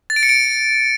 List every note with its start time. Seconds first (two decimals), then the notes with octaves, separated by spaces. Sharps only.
0.10 A6
0.16 D7
0.23 C#7
0.29 D7